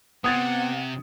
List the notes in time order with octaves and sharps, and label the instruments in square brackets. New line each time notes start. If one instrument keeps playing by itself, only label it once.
[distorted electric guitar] C3 [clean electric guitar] B3 [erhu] F#5 [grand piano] D#6 G#6 A6